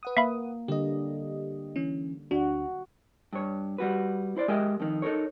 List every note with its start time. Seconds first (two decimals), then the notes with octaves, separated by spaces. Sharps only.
0.03 B4 F#5 D#6
0.17 A#3 E5 F5 B5
0.68 D3 G3 G4 D#5
1.76 E3 C#4
2.31 D2 D4 F#4
3.33 G2 C#5
3.78 G3 F#4 B4
4.36 E4 C5 D5
4.48 G#3 G4 A#4 D#5 E5 G5
4.80 F2 D#3
5.02 D#4 A4 A#4 C#5